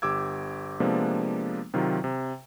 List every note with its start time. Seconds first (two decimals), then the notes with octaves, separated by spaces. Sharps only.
0.02 G1 G4 D6 E6 G#6
0.80 C3 F3 G#3 A#3 B3 D4
1.74 C3 D#3 F#3 F4
2.04 C3